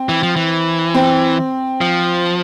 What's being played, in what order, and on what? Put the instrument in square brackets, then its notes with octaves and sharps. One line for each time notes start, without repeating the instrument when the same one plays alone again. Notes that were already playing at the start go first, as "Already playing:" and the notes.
Already playing: [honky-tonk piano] C4
[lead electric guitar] E3
F3
E3
[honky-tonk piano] C4
[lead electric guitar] F3